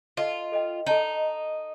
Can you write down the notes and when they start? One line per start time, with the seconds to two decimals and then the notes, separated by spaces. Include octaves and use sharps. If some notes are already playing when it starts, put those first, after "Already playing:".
0.17 D#4 F4 A4 D#5
0.52 A4 D#5 G5
0.86 D#4 A4 D#5 A5 C6